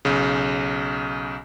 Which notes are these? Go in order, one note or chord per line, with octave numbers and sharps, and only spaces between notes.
B1 C#3